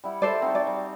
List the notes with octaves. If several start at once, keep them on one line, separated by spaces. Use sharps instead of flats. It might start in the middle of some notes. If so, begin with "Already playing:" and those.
G3 E4 F#5
A4 C5 D5 A5
C4 D#4 F#4
D5
G3